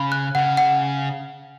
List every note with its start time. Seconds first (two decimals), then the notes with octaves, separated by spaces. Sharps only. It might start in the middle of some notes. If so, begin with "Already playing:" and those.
Already playing: C#3 B5
0.12 F#6
0.35 C#3 F#5
0.57 F#5